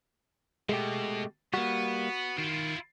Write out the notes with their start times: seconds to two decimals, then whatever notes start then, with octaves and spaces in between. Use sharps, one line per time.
0.69 B2 G#3 A3 G4
1.54 G3 A#3 B3 F#4
2.38 D#3 E4 F4